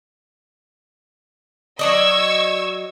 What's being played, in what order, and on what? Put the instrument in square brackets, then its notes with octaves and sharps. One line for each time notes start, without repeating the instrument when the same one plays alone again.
[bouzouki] F#3 D5 D#5 [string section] C#6 E6 G#6